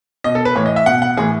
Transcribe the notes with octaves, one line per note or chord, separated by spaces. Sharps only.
B2 D#5
A4
B4
A2 E3 C#5
D#5
E5
B2 F#5
F#5
A2 E3 G#4